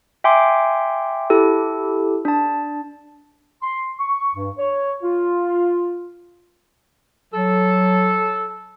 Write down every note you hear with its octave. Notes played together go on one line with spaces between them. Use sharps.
E5 G5 G#5 C6 D6
E4 G4 A4
D4 A5
C6
C#6
G2
C#5
F4
F#3 A4